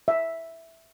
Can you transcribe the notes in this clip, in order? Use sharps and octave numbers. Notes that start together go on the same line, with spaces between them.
E5